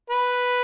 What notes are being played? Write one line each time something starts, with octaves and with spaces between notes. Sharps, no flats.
B4